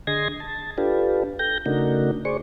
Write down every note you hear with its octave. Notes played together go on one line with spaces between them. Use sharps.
D3 G#4 D#5 C6 G#6 A#6
A5
D4 F4 G4 A4 B4
A4 G5 G6 A#6
C#3 A3 D4 D#4 F#4 A#4
G#4 C5 D5 C#6